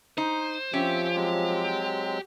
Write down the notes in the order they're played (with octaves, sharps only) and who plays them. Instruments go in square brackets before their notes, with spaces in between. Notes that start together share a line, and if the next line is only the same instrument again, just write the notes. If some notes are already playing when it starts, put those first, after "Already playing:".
[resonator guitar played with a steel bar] D#4 [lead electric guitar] C5
[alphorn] F3 [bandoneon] C4 E5 [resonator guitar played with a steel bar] C#4 [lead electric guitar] G4
[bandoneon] F#3 G#3 C4